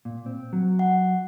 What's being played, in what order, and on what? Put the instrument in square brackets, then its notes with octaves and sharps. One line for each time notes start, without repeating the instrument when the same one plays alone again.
[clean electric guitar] A#2
C4
F#3
[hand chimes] F#5